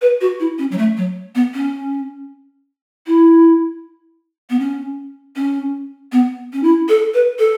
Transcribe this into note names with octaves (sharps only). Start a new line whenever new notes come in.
B4
F#4
E4
C#4
F#3
A3
F#3
B3
C#4
E4
B3
C#4
C#4
B3
C#4
E4
A4
B4
A4